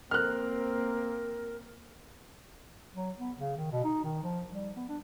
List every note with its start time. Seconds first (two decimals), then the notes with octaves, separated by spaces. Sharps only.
0.11 A#3 C4 A#4 F6 F#6
2.95 F#3
3.19 B3
3.39 C#3
3.57 D#3
3.72 B2
3.84 D#4
4.04 D#3
4.23 F3
4.52 G3
4.76 B3
4.89 D4